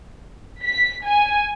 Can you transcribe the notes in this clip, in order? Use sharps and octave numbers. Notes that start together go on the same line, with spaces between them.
B6
G#5